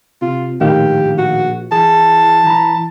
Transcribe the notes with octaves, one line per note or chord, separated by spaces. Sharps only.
C3 F4
A#1 A2 D#3 G4 F5
F#4
E3 G#4 A5
E3 A#5 B5